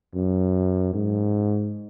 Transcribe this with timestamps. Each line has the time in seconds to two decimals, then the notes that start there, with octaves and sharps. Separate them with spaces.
0.15 F#2
0.94 G#2